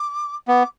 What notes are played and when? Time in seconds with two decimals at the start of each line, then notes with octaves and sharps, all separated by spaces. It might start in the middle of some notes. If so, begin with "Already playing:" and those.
Already playing: D6
0.48 B3 D6